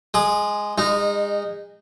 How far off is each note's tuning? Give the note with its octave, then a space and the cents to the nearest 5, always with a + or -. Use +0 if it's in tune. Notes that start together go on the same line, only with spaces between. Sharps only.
G#3 +0 D#6 -35
G#3 -35 D#4 -15